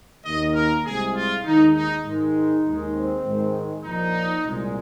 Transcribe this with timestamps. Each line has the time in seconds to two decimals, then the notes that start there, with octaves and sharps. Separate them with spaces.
0.25 D#2 D#3 A#3 D#5
0.55 A#4
0.85 C2 C3 G#3 G#4
1.15 F4
1.44 D#2 D#3 G#3 D#4
1.75 D#4
2.04 G#2 D#3 G#3
2.35 D#4
2.65 D#2 D#3 G#3
2.95 C4
3.24 G#2 D#3 G#3
3.84 A#1 A#2 F3 D#4
4.44 C2 A#2 G#3